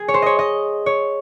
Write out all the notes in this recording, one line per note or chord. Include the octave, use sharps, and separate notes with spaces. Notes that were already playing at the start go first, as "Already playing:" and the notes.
Already playing: G#4
C#5
C5
C#5 D#5
D#5
C#5